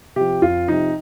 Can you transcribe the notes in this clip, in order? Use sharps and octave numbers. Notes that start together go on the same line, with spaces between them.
C3 F3 G4
F2 F4
C3 F3 D#4